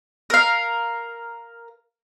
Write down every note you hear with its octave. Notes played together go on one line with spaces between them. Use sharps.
A#4 F5